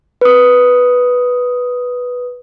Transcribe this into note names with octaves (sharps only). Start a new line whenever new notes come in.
B4 D#6